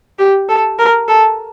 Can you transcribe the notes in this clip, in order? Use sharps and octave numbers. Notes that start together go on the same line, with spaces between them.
G4
A4
A#4
A4